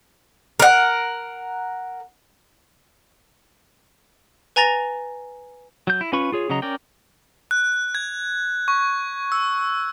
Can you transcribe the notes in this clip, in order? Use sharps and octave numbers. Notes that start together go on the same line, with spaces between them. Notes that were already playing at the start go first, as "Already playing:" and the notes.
A#4 F#5
B4 G#5 A#5 A6 A#6 F7
F#3 G6
E4
C#4 F4 B4 B5 C#6
F4 G#4 C#5
C#3 F#3 D#5 A#5
C#4 A#4 D5 G5
F#6
G#6
C#6
E6